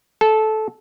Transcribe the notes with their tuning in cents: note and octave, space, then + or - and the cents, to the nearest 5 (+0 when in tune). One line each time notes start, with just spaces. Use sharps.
A4 -15